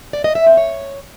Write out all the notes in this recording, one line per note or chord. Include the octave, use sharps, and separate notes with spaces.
D5
D#5
E5
C4
C#5